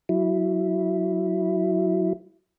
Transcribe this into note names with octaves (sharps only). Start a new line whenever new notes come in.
F#3 E4